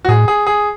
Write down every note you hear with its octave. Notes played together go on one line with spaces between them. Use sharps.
F#4
A2 G#4
G#4
G#4